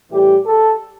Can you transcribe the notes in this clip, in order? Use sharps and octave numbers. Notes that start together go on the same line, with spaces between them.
A2 E3 G3 G4
A4